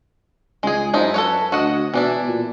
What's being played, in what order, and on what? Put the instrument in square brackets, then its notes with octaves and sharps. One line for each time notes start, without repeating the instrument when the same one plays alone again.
[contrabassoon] C#2 [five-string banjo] G#3 G#4
[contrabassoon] F#2 [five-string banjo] F3 D#4 E4
[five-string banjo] A4 B4 C#5
[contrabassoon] D2 [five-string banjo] F#4 D#5 F#5
[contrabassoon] B2 [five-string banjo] E3 D4 E4
[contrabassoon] A#2